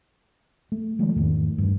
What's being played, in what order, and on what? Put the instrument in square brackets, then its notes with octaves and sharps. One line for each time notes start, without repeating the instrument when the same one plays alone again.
[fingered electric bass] A3
D#3 F3 G#3 A3
E2 G#2 D#3 A3
G2 E3